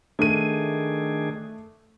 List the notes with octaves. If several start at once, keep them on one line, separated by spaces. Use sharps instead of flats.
D#3 A3 D4 G#4 D#7